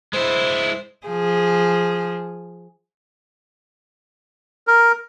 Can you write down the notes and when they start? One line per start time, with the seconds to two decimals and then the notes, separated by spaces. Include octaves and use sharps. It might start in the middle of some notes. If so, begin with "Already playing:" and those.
0.13 G#3 E4 C5
1.07 F3 G#4
4.67 A#4